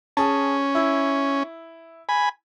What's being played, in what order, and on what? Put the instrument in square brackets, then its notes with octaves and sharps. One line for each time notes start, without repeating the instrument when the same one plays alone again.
[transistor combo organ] C#4 [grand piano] G#4 A5
[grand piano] E4
[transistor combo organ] G#5 B5